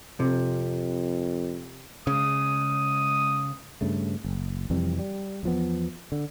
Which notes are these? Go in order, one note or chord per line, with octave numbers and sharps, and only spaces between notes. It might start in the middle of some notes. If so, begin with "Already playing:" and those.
F2 C3
C#3 G#3 D#6
G2 C#3 A3
F#1
F2 C3 E3 G3
G3
E2 F3 B3
D3